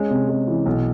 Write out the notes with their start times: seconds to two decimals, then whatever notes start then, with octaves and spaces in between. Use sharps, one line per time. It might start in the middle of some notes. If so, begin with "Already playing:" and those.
Already playing: G#3 C#4
0.10 C3
0.29 G#3
0.48 E3
0.66 B1